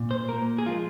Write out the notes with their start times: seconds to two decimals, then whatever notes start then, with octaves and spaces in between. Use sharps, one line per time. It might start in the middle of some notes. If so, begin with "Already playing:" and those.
Already playing: A#2
0.11 C5
0.28 A#2 A#3 A#4
0.58 G#4
0.66 F3 G#3 F4